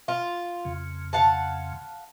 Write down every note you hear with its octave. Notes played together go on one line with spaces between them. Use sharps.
F4
F2 C#3
F5 F#5 A5